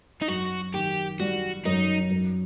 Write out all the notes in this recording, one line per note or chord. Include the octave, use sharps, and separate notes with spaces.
D#4
F#2 F#4
D#3 G4
G3 F#4
F#2 D#4
F#2